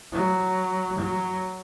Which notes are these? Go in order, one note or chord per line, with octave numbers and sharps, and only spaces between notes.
F#3
F#3